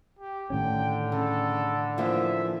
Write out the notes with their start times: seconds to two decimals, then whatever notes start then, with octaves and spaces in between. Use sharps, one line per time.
0.19 G4
0.50 A2 D3 D#3 C#4 G5
1.12 C#3 A4
1.98 E3 F3 A#3 E5